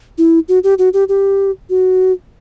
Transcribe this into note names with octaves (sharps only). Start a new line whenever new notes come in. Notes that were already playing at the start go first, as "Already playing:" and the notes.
E4
F#4
G4
F#4
G4
G4
F#4